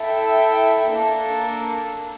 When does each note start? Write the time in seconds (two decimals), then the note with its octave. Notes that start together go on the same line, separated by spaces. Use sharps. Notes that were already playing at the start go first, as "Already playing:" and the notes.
Already playing: E4 A4 E5 G5
0.90 A#3 D4 A4